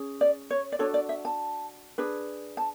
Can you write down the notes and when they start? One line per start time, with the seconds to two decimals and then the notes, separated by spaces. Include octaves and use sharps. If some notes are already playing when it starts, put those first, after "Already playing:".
Already playing: C#4 G#4
0.21 D5
0.50 C#5
0.72 D5
0.79 D4 F#4 A4 C#5
0.94 D5
1.09 E5
1.25 A5
1.98 D4 G#4 B4
2.57 A5